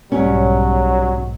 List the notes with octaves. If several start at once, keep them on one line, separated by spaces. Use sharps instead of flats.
B1 G#2 F#3 G3 C#4